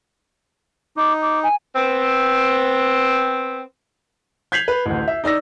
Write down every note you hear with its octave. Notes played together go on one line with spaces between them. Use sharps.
D#4 D6
D6
G#5
B3 C4
G6 G#6 B6 C7 F7 F#7
B4
A1 D2
E5
D#4 D5 E6 A#6